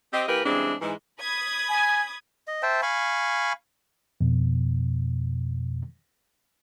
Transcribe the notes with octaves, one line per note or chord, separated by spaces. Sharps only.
C4 G4 D#5
E3 A#3 G4 A#4 B4
C#3 E3 G3 G#3 C4 D4
G#2 E3 G#3
B5 D#6 G#6
G#5
D#5
C5 E5 G5 A5
F5 G#5 B5 C#6
F2 B2